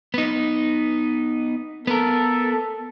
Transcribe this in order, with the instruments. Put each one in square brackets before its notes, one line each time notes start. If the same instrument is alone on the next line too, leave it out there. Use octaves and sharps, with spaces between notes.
[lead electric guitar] B3 D#4
[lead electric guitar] B3 A#4 [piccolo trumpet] A4